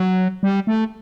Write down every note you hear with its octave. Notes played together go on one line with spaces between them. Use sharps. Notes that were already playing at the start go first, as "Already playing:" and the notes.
Already playing: F#3
G3
A3